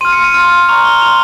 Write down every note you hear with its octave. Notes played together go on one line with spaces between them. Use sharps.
C6 F6 D#7
C#7
D#7
C6 F6
A#5 C#6 F6 F7
G7
C6 F6 F7